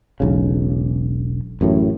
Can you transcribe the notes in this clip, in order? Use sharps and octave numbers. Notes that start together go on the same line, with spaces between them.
E1 B1 C#3
A1 F#2 A2